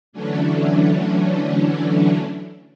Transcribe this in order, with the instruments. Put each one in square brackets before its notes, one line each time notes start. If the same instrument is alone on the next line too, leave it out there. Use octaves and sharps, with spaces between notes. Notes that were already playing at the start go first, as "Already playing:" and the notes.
[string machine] D3 E3 F#3 A3 C#4 D4